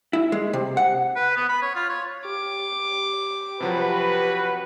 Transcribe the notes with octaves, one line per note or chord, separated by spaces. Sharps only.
E4
G#3
C3
F#5
B4
B3
B5
C#5
F4
C#5
G4 D6
C3 F3 F#3 F#4 B4